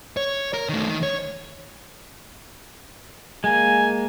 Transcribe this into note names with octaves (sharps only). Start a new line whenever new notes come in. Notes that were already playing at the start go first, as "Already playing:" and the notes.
C#5
A#4
D#3 A3
D#3
C#5
G#3 A#3 G#5